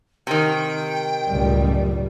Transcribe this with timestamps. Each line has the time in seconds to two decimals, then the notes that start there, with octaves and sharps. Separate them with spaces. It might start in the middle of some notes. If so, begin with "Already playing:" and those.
0.27 C3 D#3 G5
1.28 C#2 F#2 A2 G3